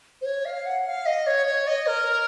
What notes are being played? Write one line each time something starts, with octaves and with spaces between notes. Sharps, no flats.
C5
C#5
F5
F#5
F5
D#5
C#5
C#5
D#5
A#4